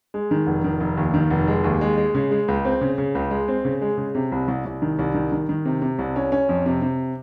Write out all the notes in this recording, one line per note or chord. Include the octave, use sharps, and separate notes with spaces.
G#3
D#3
F1
D#3
F1
D#2
D#3
F1
G#3
D#2
G#3
G#3
C#3
G#3
C#2
C4
C#3
C#3
C#2
G#3
C4
C#3
G#3
C#3
C3
C2
C2
C2
D#3
C2
D#3
D#3
D#3
C3
C3
C2
C#4
C#4
F2
C3
C3